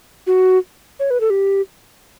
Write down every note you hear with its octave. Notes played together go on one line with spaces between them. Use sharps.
F#4
C#5
B4
A4
G4